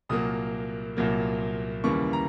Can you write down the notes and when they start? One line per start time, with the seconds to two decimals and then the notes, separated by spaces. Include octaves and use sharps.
0.09 C2 A#2 F#3 A#3 D#6
0.97 C2 A#2 F#3 A#3
1.84 D#2 C#3 E3 G3 A#3 C#6
2.13 A#5